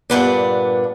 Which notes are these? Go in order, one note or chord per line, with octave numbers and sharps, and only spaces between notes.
G2 A#2 B3 D4